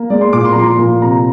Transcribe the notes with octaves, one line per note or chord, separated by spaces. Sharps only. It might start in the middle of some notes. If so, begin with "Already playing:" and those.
Already playing: A#3
G#3 D5
C6
A#2 D6
C6
A#5
F3 C6
A#2
C3 A#5